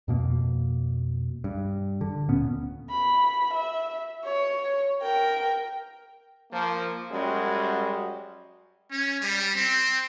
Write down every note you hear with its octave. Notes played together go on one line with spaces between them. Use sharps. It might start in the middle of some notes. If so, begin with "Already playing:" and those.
F2 B2 A#3
G2
D3
D1 A#2 B3 C#4
B5
E5
C#5
A#4 G5
F3 A#3
F#2 G3 G#3 F#4
C#4
G3
C4